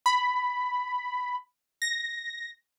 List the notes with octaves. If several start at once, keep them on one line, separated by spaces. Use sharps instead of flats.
B5
A#6